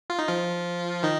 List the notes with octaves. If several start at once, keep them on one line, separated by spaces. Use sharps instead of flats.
F4
D#4
F3 F4
D#3 D#4